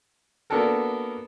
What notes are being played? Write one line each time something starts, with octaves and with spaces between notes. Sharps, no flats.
A#3 B3 D4 F#4 A4 A#4